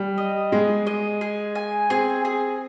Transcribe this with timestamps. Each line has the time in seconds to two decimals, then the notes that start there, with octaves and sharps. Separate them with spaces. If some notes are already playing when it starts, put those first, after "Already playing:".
Already playing: G3
0.18 D#5
0.52 G#3 G#4
0.87 D#5
1.21 G#4
1.55 G#5
1.90 C4 G#4
2.25 G#4